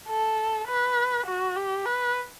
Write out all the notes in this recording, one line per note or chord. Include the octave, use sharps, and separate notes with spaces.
A4
B4
F#4
G4
B4